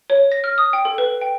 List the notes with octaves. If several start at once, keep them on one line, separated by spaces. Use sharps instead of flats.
C#5
A#6
F6
D#6
G5
A4
B4
G5